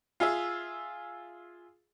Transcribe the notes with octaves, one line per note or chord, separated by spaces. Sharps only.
F4 G#4 E5